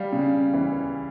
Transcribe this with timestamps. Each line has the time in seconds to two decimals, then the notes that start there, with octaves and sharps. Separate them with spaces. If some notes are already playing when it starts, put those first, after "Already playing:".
Already playing: G3 F5
0.12 C#3
0.54 E3